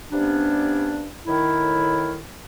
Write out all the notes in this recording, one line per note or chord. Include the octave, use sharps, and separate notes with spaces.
G2 C3 G3 B3 C#4 D4
A2 D#3 E4